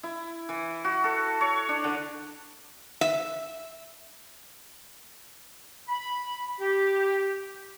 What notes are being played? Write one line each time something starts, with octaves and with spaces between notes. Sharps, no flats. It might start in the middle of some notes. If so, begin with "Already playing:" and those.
E4
E3
F#4
A4
C#5
D4
D3
E5
B5
G4